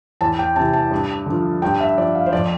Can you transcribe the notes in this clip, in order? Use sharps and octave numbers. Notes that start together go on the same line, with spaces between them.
E2 A5
G5
C3 E3 A5
A5
G2
D3
F3
G2 G5
E5
F3 D5
F5
C5
F2 D5